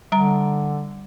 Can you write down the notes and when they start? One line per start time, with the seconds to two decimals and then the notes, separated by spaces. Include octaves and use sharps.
0.12 D3 G3 A#5